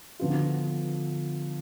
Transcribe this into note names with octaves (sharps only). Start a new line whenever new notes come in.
D3 F3 B3 F4